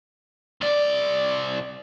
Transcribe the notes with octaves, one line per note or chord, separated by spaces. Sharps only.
C2 D5